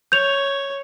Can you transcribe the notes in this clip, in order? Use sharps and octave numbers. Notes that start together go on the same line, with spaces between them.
C#5 G6 F7